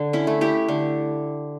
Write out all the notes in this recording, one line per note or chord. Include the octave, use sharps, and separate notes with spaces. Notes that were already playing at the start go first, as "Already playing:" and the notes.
Already playing: D3
C#4 E4
A3
E4 G4
D3